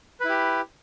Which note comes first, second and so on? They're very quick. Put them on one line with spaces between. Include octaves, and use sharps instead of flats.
B4 E4 G4